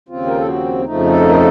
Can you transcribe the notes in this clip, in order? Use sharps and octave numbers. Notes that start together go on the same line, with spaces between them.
D#2 C#3 F3 C4 F4
A#4
A4
F#4
F2 C#3 F3 A3 D#4
A4
A#4
A4